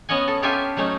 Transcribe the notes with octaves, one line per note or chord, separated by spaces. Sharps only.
B3 C#4 D#5 F#5 G#5
A4
C#4 F4 G4 A4 E5 G#5
F#3 A3 C#4 D#4